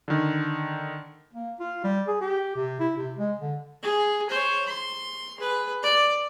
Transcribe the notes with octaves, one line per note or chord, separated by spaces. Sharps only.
D3 D#3
A#3
F4
G3
G#4
G4
C3
E4
C3
G#3
D3
G#4
C5 C#5
C6
G#4 B4
D5